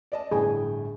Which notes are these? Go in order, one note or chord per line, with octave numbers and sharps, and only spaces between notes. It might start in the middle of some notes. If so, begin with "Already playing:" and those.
D5 D#5 A5
G1 A2 G#4 G5